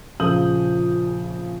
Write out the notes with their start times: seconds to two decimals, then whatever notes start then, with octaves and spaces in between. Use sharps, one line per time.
0.20 A#1 C#3 F3 D#6 G6 F#7